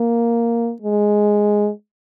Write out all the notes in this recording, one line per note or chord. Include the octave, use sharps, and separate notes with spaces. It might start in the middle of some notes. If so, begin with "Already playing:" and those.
Already playing: A#3
G#3